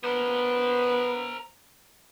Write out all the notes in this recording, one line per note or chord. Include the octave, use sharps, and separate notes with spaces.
B3 A#4 C5